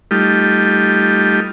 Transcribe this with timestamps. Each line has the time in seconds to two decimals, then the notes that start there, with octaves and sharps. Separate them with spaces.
0.11 G3 A3 D#4 F4 G4